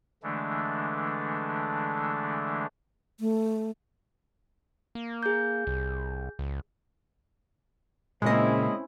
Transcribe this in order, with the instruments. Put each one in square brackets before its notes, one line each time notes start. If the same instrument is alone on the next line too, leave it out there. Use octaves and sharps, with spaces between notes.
[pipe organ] D3 E3 G#3 A3 D4
[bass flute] A3
[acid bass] A#3
[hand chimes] G#4 G6
[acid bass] C2
C#2
[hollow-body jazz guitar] A#2 C#3 A#3 [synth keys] G#3 D#5 [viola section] C4 C#4 E4